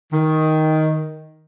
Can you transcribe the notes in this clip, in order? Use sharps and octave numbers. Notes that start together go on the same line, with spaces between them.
D#3